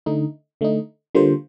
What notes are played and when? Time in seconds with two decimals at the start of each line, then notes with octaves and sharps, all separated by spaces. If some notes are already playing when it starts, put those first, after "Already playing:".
0.06 D3 A3 D#4
0.61 D3 A3 D#4
1.15 D3 G3 A#3 F4 C5